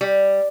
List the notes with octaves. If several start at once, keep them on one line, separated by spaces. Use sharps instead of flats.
G3